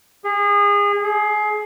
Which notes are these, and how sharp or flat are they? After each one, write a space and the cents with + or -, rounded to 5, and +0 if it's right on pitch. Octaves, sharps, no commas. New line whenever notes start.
G#4 -30
G#4 +25